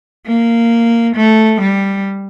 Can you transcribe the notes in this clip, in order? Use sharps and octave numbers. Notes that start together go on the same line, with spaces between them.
A#3
A3
G3